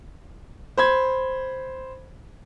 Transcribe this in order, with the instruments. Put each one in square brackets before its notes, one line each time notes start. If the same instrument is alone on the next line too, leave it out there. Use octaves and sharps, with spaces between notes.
[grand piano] C5 B5 G#6